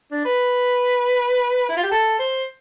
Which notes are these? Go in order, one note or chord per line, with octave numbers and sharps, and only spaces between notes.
D4
B4
E4
F4
G4
A4
C5